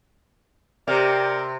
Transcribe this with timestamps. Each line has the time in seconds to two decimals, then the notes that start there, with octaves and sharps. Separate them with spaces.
0.88 C3 A#4 D5 G5